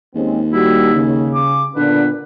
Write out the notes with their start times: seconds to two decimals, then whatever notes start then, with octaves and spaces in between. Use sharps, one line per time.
0.15 D#2 G#3 C4 C#4
0.52 G3 E4 F#4
0.94 C#3
1.34 D6
1.76 A#2 D3 B3 D4 B4